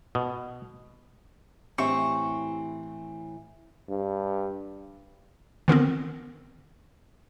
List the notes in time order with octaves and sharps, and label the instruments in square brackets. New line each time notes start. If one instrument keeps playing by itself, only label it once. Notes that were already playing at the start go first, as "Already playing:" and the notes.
[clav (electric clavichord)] B2
[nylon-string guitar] A2 E3 [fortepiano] C4 [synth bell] G4 E5 [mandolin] C#6
[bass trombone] G2
[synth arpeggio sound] D3 D#3 B3 C4